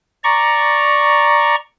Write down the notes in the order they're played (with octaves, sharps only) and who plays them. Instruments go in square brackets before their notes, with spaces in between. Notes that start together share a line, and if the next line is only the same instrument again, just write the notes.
[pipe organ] D5 A#5 C#6